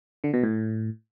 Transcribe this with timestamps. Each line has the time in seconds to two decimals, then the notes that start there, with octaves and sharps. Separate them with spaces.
0.24 D3
0.34 B2
0.43 A2